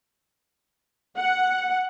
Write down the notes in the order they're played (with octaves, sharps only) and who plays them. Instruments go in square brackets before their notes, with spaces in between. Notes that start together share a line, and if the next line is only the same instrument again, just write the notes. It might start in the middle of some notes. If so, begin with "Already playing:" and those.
[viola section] F#5